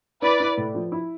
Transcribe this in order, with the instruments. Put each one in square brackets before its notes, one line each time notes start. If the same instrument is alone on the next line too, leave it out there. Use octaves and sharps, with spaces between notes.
[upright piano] E4 [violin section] B4 D5
[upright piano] E4
A2
F3
E4